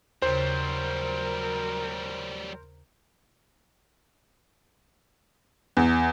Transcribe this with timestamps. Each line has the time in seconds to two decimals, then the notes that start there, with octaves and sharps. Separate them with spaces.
0.22 D#2 C#3 F#3 G3 A#4 C5
5.77 E2